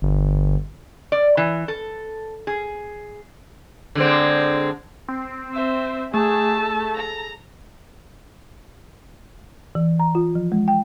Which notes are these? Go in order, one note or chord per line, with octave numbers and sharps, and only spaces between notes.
G1
D5
E3
A4
G#4
D3 G#3 C4
C4
C5 E5
A3 G#4 A5 E6
A4
A#5
E3
A#5
F4
F3
G#3
G5